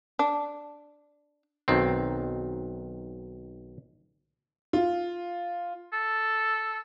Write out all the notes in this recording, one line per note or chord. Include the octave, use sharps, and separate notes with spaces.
D4
B1 D#3 C4
F4
A4